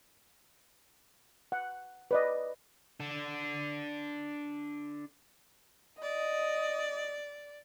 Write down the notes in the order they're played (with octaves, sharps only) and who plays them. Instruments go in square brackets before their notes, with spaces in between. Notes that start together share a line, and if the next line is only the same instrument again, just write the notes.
[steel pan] F#5
B4 D5 D#5
[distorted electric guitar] D4 A4
[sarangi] D5 [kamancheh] D#5